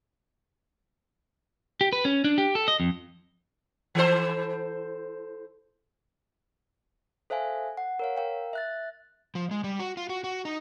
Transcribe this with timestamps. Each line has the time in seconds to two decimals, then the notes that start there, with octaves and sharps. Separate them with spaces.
1.81 G4
1.93 B4
2.05 C#4
2.24 D4
2.38 G4
2.55 A4
2.68 D#5
2.80 F2
3.95 E3 A4 C5
7.30 A4 C5 E5 F5 G#5
7.77 F#5
7.99 A#4 C#5 F5
8.17 A#4 F5 G5
8.53 E5 F#6 A6
9.35 F3
9.51 G#3
9.64 G3
9.80 F#4
9.97 F4
10.09 F#4
10.24 F#4
10.45 D#4